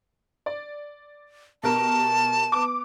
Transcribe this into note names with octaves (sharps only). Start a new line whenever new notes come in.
D5
B2 G4 A#4 A5
B3 D6